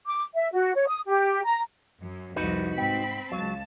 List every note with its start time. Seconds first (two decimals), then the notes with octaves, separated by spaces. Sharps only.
0.06 D6
0.35 E5
0.53 F#4
0.75 C#5
0.88 D#6
1.08 G4
1.45 A#5
2.01 F#2
2.36 C2 F2 D#4 F#4 B4
2.78 G#2 C4 G5 B5
3.32 C#2 F#3 F5 A5